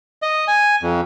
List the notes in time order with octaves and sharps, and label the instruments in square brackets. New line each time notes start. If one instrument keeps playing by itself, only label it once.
[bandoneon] D#5
G#5
F2